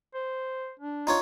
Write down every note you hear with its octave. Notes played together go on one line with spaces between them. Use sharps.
C5
D4
D#4 F4 C#5